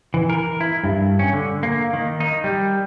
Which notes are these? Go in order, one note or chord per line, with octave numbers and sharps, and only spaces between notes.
E3
A#4
E4
G2
C#4
D3
A#3
D#3
D#4
G3